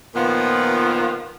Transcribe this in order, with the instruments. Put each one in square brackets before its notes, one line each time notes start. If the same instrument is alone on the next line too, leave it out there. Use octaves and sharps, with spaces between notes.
[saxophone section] A#2 D#3 F3 B3